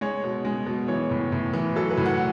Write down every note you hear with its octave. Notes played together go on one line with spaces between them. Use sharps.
G#3 C#5
B2
G#3
B2
E3 C#5
A2
A2
E3
F#3 A4
B4
A2
F#5